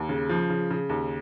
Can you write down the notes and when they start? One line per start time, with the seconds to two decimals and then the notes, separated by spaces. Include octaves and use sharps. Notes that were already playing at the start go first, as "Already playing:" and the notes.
Already playing: D#2
0.09 C#3
0.29 F3
0.50 C#3
0.70 C#3
0.89 D#2